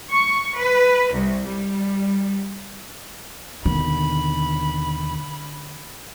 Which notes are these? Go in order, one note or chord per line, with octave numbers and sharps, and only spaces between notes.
C#6
B4
C2
G3
D#2 B2 D3 D#3 B5